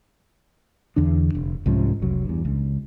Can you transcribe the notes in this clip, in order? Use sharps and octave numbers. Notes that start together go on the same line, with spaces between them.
E2 D3 D4
F1
C2 G#2 F3 C#4
F1 C2 F#3
E2 G2
C#2